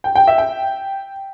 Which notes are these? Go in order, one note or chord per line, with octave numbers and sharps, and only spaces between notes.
G5
G5
E5
G5